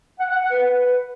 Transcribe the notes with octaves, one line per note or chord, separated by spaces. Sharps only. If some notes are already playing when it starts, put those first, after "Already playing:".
F#5
F#5
F#5
B4